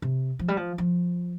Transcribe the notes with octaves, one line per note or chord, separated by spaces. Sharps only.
C3
F3
G3
F3
F3